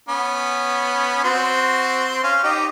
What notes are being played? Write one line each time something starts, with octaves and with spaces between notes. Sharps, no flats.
B3 C#4
C4 F#4 C6
C#4 F5
D#4 G4 D#5